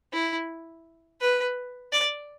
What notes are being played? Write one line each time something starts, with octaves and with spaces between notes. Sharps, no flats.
E4
B4
D5